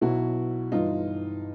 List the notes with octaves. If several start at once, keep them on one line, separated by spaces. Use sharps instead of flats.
B1 B2 F#3 E4 F#4
G1 G2 E3 D#4 F4